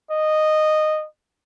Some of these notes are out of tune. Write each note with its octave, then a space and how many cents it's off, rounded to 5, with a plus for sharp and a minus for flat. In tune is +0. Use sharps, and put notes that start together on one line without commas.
D#5 -10